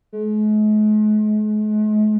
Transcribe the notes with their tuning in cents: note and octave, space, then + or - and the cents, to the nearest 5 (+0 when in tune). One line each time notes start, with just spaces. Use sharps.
G#3 +45